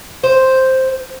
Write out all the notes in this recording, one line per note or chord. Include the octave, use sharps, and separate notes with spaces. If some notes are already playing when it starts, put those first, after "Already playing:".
C5